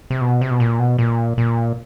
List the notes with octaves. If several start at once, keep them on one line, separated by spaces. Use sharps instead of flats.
C3
B2
C3
B2
A#2
B2
A#2
A#2